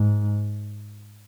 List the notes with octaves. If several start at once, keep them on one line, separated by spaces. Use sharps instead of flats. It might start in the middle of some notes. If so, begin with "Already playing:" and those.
Already playing: G#2